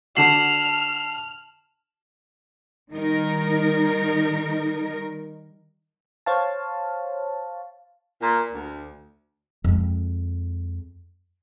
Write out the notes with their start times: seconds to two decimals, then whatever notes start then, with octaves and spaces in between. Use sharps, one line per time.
0.17 D3 D4 F#4 A5 F6 C7 E7 F#7
2.91 D#3 G3 D#4 A#4
6.26 C5 C#5 F5 A5
8.20 A#2
8.53 D2
9.64 F2 G#3